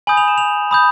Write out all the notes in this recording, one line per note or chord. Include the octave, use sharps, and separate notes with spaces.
G#5 B5 D#6 G6 F#7
F7
E7
F7
B5 D#6 G6